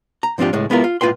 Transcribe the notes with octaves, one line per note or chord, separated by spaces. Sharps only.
A#5
G#2 F3 C4 D4 F4 G4
C#2 A2 G#3
G#3 B3 E4 F4 A#4
F4
B1 A2 F4 B4 G5 C6